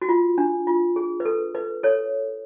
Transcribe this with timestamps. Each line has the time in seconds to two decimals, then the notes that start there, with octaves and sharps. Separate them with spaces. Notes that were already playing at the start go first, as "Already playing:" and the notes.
0.02 F#4
0.09 F4
0.38 D4
0.67 F4
0.96 G#4
1.20 B4
1.25 A4
1.55 B4
1.83 A4 C#5